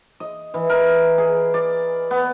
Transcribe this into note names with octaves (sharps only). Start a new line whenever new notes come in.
D#5
E3
A#4
G#4
D5
B3